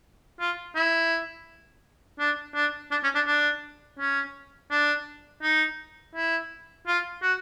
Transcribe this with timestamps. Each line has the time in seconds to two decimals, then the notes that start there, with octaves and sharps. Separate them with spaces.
0.40 F4
0.76 E4
2.19 D4
2.55 D4
2.91 D4
3.04 C#4
3.15 D4
3.27 D4
3.99 C#4
4.71 D4
5.43 D#4
6.15 E4
6.87 F4
7.22 F#4